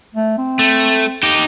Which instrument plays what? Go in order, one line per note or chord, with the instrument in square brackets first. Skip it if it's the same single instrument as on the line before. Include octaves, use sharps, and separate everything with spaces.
[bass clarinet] A3
C4
[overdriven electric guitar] A3
D#4 G4